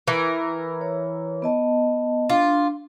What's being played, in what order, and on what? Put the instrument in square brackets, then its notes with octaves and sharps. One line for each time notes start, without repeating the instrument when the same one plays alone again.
[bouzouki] E3 A#4
[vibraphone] C#5
B3 D#5 A5
[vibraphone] D4 [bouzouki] F4